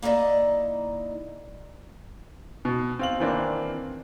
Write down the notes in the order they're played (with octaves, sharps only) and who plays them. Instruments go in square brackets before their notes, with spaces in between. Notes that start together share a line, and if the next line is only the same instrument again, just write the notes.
[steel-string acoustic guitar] A#3 D#4 E4 D5 D#5
[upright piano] B2
C4 F5 F#7
D#3 E3 A#3 C4 D4